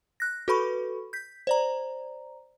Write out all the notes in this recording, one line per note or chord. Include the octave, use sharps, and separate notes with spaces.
F#6 A#6
F#4 A4 B4 B5 C#6
G6 B6
C5 D5 A#5